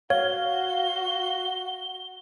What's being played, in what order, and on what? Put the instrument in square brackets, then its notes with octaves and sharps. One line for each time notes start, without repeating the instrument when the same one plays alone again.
[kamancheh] F#4 [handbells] C#5 [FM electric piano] F5 [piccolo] G7